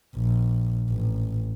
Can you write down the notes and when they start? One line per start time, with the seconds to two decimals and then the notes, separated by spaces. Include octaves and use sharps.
0.16 A#1
0.90 A1